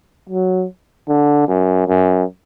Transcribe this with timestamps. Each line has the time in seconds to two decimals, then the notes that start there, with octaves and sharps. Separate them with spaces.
0.29 F#3
1.08 D3
1.48 F#2
1.88 F#2